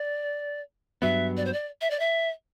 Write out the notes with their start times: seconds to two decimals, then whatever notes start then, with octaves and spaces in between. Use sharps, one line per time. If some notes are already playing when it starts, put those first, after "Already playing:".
Already playing: D5
1.02 G2 F#3 B3 E5
1.37 D5
1.45 C5
1.53 D5
1.81 E5
1.90 D5
2.00 E5